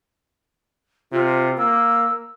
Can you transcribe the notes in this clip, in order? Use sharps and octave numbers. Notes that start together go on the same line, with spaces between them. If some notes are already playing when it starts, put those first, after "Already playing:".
C3 F4
A#3 E6